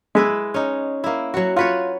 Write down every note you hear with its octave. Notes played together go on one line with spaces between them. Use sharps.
G#3 E4 B4 E5
C#4 D#4
A#3 E4
F#3 F#4
F4 F#4 B4 C#5